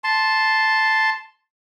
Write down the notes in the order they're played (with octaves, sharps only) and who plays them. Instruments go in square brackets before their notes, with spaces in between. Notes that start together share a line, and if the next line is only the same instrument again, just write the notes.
[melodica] A5 C6